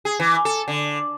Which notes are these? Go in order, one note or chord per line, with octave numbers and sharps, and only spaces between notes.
G#4
E3
A4
D3